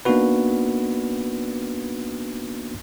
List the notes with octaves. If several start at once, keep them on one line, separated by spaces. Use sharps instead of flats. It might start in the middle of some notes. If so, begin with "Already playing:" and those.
A#3 B3 D4 D#4 F#4 B4